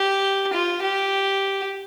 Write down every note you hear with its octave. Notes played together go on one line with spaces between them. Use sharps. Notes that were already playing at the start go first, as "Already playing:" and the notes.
Already playing: G4
F4
G4